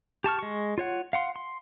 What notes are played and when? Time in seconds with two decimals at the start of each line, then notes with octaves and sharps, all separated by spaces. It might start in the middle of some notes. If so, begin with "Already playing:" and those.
0.24 G4 A5 C#6 F6
0.39 G#3 C#6
0.78 F4 C#5 F#5
1.13 F5 F#5 C6
1.36 C6